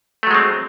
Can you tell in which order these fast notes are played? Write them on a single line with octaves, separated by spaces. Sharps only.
A3 F#3 G#3 C4